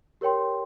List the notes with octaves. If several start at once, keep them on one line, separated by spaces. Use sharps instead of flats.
G4 A#4 C#5 G5 C6